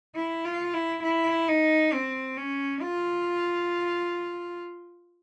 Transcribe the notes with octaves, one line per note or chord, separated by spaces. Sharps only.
E4
F4
E4
E4
D#4
C4
C#4
F4